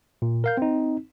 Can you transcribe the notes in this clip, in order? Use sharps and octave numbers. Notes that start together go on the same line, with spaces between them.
A#2
A#4 F5 G6
C4 D#4